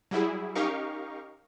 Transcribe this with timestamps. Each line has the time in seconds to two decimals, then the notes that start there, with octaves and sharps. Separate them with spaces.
0.11 F#3 G3 E4 G#4
0.55 C#4 D#4 G4 A#4 F5 C#6